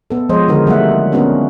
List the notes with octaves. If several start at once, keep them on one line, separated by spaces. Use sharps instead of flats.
B3 A4
F3 G#3 C5 C#5 D#5
D3 D#3 G#3 F#4 A#4
F#3 G3 A3 A#3 E5 F#5
A#3 B3 C#4 D4 F#4 A#4